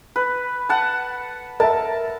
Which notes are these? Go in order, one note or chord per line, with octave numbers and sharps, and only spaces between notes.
B4
F#5 A5
A#4 E5 A5